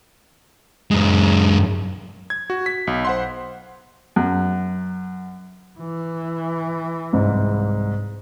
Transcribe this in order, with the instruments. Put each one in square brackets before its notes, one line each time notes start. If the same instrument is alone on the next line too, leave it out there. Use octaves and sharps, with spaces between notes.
[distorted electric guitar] F#2 G#3
[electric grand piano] G#6
F#4
B6
B1
C5 F#5 C6
[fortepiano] F#2
[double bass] E3
[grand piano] C2 G#2